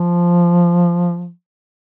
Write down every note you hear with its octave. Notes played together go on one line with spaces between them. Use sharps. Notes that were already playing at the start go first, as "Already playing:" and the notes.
Already playing: F3